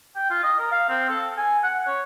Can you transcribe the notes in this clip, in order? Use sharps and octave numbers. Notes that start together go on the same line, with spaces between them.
G5
F4
D#5
A#4
F5
C4
A4
G#5
F#5
C#5